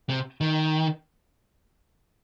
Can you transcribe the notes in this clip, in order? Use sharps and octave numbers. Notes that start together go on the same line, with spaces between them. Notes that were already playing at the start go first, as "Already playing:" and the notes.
C3
D#3